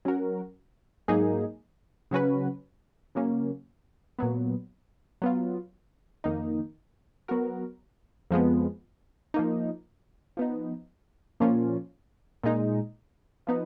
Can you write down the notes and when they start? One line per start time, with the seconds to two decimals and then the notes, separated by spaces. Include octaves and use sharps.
0.05 F#3 C#4 F#4 A#4
1.08 G#2 F#3 A#3 D#4 G#4
2.11 C#3 F#3 C#4 F#4 B4
3.15 C#3 F#3 A#3 C#4
4.19 A#2 F#3 B3
5.22 F#3 B3 F4
6.24 F2 D#3 A#3 D#4
7.28 F#3 B3 F#4 A#4
8.31 F2 F3 G#3 B3
9.34 F3 A#3 D#4
10.37 F3 B3 D#4
11.40 A#2 F3 A#3 C#4 F4
12.44 A#2 G#3 D#4
13.47 F3 B3 D#4